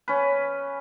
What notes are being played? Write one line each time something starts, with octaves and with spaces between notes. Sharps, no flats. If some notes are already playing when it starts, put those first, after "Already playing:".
C#4 B4